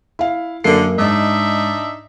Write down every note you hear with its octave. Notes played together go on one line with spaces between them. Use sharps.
E4 F5
F#2 D3 A#3 C7
G#2 D4 D#4 E5